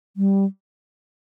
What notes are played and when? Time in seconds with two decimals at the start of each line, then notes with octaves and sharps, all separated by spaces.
0.17 G3